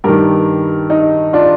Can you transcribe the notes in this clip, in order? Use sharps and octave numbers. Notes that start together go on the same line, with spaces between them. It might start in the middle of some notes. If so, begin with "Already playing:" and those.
G2 D#3 G4 A#4
D#4
D4 F4